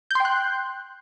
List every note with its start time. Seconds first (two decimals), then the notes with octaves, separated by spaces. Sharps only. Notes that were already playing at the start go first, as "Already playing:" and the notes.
0.11 G6
0.15 C6
0.20 G5
0.25 F#6